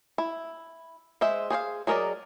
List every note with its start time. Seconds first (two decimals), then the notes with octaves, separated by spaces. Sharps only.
0.18 E4
1.21 G#3 C5 E5
1.50 G#4 C5 C#5 F5
1.87 F#3 G#4 A#4 D5 D#5